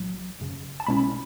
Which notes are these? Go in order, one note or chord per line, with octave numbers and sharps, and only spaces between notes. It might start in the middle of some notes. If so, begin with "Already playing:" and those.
Already playing: B1 A2 F#3
G#1 F#2 C#3
A5
B1 B2 G#3 C#4 E4 B5